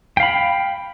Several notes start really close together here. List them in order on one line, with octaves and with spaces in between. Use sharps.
G5 F5 B5